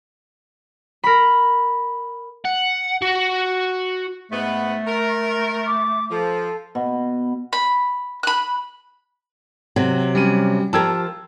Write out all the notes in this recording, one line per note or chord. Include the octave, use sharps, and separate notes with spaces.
A#4 B5
F#5
F#4
G#2 A3 B3
A#4
D6
F3 A4
B2
B5
B5 F#6
C3 F#3
G3 C#4 D#7
F3 G4 A#4 A5 E6 G#6